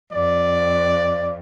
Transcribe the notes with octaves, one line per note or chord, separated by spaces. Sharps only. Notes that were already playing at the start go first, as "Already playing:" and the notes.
F2 D5